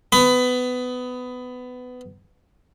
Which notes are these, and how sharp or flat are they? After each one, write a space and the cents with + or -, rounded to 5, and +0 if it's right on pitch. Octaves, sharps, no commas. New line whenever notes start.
B3 +20 B5 +20